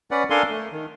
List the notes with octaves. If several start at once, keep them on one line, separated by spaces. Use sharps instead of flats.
C#4 B4 D5 F#5
D4 A4 A#4 F5 G#5 C6
A3
D#3